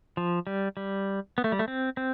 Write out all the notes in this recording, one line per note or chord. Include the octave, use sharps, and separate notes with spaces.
F3
G3
G3
B3
A3
G3
A3
C4
C4